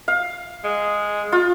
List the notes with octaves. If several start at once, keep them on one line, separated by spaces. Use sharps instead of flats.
F5
G#3
F4